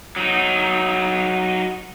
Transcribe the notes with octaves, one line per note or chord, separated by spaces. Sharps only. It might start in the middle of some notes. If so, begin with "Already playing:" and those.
F#3 D#4